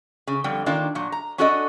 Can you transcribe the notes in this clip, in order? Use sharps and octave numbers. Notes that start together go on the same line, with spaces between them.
C#3
F2 D3 G3 G5
D#3 A#3 D4 F4
A#2 F#3
A#5
C#4 D4 F#4 A4 D5 D#5